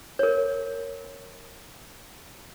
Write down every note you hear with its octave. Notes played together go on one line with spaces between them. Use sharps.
A#4 C#5